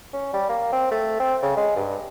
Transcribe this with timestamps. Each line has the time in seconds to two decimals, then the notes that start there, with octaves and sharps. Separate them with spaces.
0.13 C#4
0.33 G3
0.49 A#3
0.73 C4
0.91 A3
1.20 C4
1.42 C#3
1.57 G#3
1.76 G2